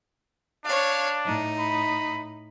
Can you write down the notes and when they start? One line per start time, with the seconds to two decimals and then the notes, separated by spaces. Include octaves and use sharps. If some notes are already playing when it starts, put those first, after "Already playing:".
0.65 D4 C#5 F5
1.24 A2 D#4
1.59 B5